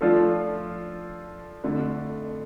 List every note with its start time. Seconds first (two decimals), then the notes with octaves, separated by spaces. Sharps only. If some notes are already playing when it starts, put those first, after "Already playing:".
0.01 F3 A3 D4 F4 A4
1.64 F2 D3 A3